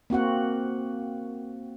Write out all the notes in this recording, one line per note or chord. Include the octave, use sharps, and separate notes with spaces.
A#3 C4 F#4 F#5